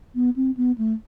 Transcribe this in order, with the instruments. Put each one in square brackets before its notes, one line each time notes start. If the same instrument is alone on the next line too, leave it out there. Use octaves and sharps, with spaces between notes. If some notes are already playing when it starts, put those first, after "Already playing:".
[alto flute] B3
C4
B3
A3